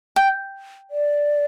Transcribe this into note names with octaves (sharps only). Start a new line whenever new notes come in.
G5
D5